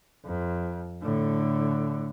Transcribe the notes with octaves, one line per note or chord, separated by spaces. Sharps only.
F2
A2 D3